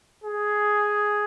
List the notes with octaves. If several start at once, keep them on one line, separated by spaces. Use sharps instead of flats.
G#4